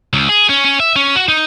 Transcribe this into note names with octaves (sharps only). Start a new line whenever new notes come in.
C#2
G#4
C#4
C#4
E5
C#4
F#4
D#4